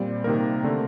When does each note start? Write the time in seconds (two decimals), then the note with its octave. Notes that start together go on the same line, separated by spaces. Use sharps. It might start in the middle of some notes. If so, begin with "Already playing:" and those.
Already playing: A#2 G3 C4 D5
0.24 C3 D#3 A#3 A#4
0.63 D3 A3 C4